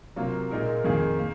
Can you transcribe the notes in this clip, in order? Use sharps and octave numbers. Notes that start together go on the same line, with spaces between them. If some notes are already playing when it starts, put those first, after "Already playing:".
C3 F#3 A#3 F4
A#2 G#3 D#4 A#4
F2 D#3 A#3 F4 G#4
A#3